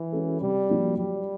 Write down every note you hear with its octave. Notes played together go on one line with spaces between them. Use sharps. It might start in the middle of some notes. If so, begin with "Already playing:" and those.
Already playing: E3
G#3 C#4 F#4 A4
C3 G3
F3 A#3 D4 F#4
F#3 G3